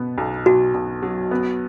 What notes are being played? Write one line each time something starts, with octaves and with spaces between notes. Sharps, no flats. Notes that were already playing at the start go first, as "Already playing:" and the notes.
Already playing: B2 B3
B1
B1 F#4
B1
F#3
B3